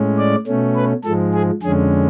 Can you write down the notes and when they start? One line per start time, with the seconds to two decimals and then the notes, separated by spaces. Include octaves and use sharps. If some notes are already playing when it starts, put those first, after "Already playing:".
Already playing: A2 G#3 C#4
0.18 D5
0.47 B2 A3 C#4
0.76 B4
1.04 G#2 F3 G#3 A4
1.33 G#4
1.62 F2 D3 G#3 C#4 G#4